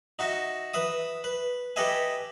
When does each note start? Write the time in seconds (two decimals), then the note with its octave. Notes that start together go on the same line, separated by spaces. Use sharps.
0.19 D#4 F#4 E5
0.74 B4 E5 D#6
1.24 B4
1.76 G4 A4 B4 D#5 E5 G#5